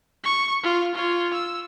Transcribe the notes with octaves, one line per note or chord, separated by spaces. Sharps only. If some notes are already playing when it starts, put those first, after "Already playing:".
C#6
F4
F4 C#5
E6